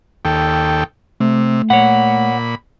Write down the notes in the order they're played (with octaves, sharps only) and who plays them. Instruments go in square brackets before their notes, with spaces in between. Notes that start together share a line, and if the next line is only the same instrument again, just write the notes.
[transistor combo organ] D#2 A4 G5
[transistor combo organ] C3 [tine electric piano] A3
[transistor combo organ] A#2 B5 [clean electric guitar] C#5 F#5